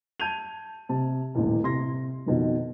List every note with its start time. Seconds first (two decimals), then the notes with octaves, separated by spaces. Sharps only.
0.20 A5 G6 G#6 D#7 F7
0.89 C3 A5
1.35 D#1 A1 E2
1.63 C3 C6 A#6
2.26 F2 B2 D#3 F3